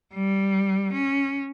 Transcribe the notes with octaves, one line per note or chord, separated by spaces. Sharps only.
G3
C#4